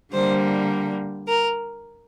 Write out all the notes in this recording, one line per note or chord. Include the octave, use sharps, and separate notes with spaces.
D3 G3 A#3 C5
A#4